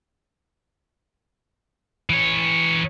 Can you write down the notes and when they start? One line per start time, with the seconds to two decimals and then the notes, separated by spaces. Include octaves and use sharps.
2.10 E3 C#5